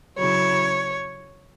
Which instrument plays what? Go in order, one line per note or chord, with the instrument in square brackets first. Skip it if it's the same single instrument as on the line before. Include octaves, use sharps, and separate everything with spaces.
[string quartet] C#3 F#3 E4 C#5